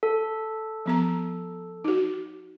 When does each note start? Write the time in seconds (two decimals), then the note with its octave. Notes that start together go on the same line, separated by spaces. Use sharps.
0.03 A4
0.86 F3 B3 A#5
1.84 D#4 F#4